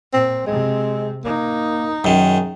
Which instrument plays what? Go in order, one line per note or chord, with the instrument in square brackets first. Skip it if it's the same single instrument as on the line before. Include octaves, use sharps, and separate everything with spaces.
[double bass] A#2 [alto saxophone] C4
[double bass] C3 C4 [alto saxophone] G#3
[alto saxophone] A#3 [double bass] D#4
[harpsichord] F#2 D#3 [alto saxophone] G#4